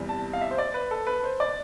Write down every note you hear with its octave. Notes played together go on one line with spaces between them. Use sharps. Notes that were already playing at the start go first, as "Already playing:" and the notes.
Already playing: E2 C3 G3
A5
F5
E5
C5
D5
B4
A4
B4
C5
D5